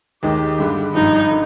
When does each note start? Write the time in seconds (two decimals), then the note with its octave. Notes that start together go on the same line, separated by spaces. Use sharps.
0.23 D#2 D#3 G#3 D#4 G4
0.58 G2 D3 G#3
0.94 G#1 G2 F3 D#4
1.31 D3